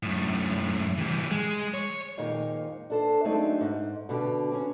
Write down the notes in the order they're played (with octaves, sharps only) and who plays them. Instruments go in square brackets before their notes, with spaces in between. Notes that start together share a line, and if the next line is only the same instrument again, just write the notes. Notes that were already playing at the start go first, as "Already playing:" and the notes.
[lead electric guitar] F#2 A2
E3 G3
G#3
C#5
[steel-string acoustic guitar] F2 A#2 D#3 G#3 C4
D4 A4 C5
F#3 G#3 A3 C4 D4 D#4
G#2
B2 D3 G4
C4 C#4